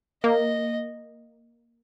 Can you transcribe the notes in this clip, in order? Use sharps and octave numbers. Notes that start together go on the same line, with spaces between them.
A#3 D#5